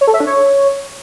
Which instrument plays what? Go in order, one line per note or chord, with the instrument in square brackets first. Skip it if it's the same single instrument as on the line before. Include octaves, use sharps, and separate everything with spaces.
[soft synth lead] C#5
A4
E5
D4
C#5